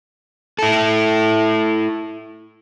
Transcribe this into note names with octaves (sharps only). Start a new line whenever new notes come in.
E4 A4